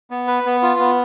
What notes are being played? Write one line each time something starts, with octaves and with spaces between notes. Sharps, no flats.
B3
B4
B3
F4
B3